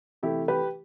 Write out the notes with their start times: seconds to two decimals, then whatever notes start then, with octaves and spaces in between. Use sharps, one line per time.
0.23 C3 E3 A3 E4 G4
0.48 G4 B4